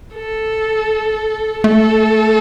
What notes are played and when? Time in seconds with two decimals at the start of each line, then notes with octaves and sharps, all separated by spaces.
0.15 A4
1.64 A3 A4